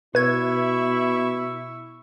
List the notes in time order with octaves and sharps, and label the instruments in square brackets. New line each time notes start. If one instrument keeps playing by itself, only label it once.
[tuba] B2 [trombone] E4 [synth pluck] B4 G#6 [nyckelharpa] E5 C#6